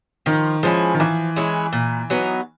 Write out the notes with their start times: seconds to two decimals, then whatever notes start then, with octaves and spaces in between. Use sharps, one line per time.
0.26 D#3 F3
0.63 F3 G#3 C#4 E4
0.94 D#3
1.00 E3 F3
1.36 G#3 C#4 E4
1.73 A#2
2.10 F#3 B3 D#4